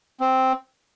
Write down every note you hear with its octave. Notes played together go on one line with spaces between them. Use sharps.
C4